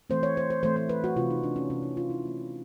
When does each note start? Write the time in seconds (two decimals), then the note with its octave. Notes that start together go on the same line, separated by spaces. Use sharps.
0.10 E3 A3 C4 C5
0.23 C#5
0.37 C5
0.50 C5
0.63 E3 A3 C4 C5
0.76 C5
0.89 B4
1.04 F#4
1.16 C3 E3 A3 C4 F4
1.30 D#4
1.44 D4
1.56 C#4
1.70 C3 E3 A3 C4 C#4
1.83 D#4
1.97 F4
2.10 E4
2.24 E3 A3 C4